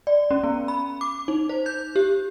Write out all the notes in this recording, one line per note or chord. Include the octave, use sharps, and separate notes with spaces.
D5
C#4
B3
B5
D6
D#4
C5
G6
G4